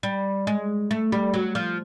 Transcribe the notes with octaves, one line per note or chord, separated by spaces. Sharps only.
G3
G#3
A3
G3
F#3
F3